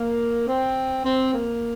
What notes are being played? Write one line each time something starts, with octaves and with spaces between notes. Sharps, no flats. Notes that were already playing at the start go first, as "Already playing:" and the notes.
Already playing: A#3
C4
C4
A#3